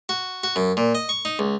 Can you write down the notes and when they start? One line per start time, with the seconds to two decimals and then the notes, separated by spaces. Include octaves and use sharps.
0.09 F#4
0.44 F#4
0.56 F#2
0.77 A#2
0.95 D#5
1.09 C#6
1.25 D#4
1.39 C#2